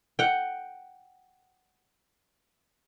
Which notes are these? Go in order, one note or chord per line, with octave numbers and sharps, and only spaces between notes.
F#5 G5